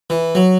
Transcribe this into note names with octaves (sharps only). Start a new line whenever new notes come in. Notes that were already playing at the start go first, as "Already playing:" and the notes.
E3
F#3